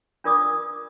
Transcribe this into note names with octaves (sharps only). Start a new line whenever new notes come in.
D4 F4 A#4 D5 D6 D#6